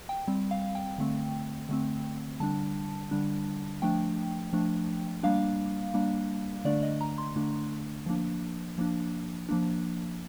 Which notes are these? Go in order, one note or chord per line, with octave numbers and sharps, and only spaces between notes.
G5
G3 C4
F5
G5
D3 A3 C4
D3 A3 C4
D3 G3 D4 A5
D3 G3 D4
F3 A3 D4 G5
F3 A3 D4
G3 A#3 D4 F5
G3 A#3 D4
D3 A3 D4 D5
D#5
A#5
C6
D3 A3 D4
F3 A#3 D4
F3 A#3 D4
F3 A#3 D4